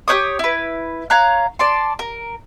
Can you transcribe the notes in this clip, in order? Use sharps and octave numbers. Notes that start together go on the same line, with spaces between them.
G4 B4 C#5 D#6
E4 B4
C#5 F5 A#5 F#6
D5 A5 C6
A#4